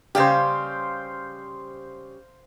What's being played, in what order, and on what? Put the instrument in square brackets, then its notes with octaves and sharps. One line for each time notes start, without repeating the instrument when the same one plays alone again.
[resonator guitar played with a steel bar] C#3 G3 G4 [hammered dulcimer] C5 F5